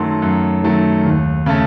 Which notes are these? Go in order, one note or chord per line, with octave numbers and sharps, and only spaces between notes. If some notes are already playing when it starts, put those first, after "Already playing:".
Already playing: F#2 D#3 F#3 A3 C6
F#2
D#3 F#3 A3
D#2
C#3 A3